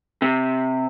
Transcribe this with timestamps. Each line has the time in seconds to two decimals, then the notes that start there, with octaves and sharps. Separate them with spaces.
0.22 C3